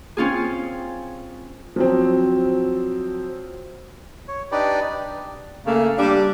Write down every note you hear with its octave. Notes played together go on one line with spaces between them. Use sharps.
C4 C#4 F4 G#4
F3 F#3 C4
C#5
D4 D#4 G4 B4 D5
C#3 A3 A#3
G3 D4